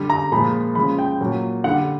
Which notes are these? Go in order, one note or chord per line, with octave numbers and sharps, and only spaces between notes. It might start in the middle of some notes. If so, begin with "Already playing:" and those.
Already playing: D3 G3
A#5
A#2 F3 G#3 B5
C#3 F3 G#3 B5
G5
A#2 F#3
D3 G3 F#5